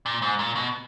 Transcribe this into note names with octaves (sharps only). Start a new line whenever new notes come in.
A#2
G#2
A#2
B2